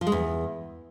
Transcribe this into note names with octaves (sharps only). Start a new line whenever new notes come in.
F3
G#3
E2